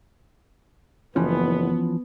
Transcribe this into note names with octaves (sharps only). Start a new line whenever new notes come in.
F#1 E3 F3 B3 C#4